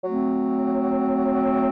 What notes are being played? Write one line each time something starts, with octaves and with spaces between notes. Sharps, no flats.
F#3 A3 C4